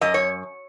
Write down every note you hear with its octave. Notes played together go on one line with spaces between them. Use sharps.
F#2 D#5
C#5